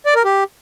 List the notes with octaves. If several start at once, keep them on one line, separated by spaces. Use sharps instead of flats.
D5
A#4
G4